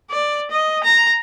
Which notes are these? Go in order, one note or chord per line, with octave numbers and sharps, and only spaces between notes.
D5
D#5
A#5